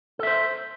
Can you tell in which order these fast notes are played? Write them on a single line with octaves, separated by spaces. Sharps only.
A4 E5 C5